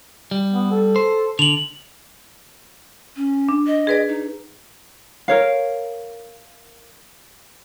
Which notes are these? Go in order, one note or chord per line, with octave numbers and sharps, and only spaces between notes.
G3
B3
A4
C5
D3 F7 F#7
C#4
D4
D#5
G#4 B4 D5
D#4
A#4 C#5 F5